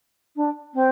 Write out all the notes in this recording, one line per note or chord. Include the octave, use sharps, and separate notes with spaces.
D4
C4